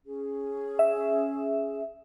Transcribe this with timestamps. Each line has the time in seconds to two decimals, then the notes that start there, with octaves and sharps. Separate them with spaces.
0.06 C#4 G#4
0.79 E5